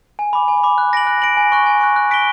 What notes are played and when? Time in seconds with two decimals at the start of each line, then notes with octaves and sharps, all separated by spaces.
0.19 G#5
0.33 B5 D6
0.48 G#5
0.63 B5 D6
0.78 F#6
0.93 A#6 D7 F#7
1.07 F#6
1.22 A#6 D7 F#7
1.37 G#5
1.52 C#6 F#6
1.66 G#5
1.81 C#6 F#6
1.96 F#6
2.11 B6 D7 G7